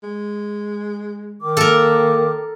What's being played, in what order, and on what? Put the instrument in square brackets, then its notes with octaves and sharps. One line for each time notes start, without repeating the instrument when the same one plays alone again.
[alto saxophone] G#3
[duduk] D#3 [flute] D6
[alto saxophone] A#3 [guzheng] A4 A#4